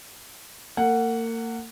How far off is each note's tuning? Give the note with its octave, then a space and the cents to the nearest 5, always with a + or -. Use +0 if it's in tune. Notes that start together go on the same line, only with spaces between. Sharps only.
A#3 -35 F#5 +0